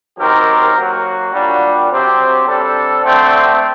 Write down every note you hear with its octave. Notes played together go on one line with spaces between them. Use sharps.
D#3 F#3 C4 G4 A#4
F#3 A#3 F#4
A#2 G3 D4 F#4
C3 F#3 C4 G4
C3 G3 D4 A4
D3 A3 C4